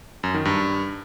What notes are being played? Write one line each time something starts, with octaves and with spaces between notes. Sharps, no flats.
F#2
D#3
G2